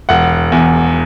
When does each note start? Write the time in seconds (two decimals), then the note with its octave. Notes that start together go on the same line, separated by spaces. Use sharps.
0.09 E1 F#5
0.52 E2